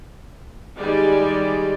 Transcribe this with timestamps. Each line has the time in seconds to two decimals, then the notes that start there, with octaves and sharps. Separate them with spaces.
0.78 D#3 G3 G#3 D5